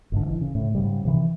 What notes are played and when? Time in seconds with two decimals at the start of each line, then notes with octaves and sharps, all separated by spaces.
0.12 G1 G#2 D3
0.26 E3
0.41 C#3
0.55 A2
0.75 G#2 C#3 G3
1.05 C3 D#3 E3